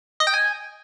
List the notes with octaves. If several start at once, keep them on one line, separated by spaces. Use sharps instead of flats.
D#5
G5
G#5